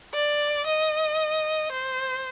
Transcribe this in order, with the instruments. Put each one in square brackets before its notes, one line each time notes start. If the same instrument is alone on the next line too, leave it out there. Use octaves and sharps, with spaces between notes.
[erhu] D5
D#5
C5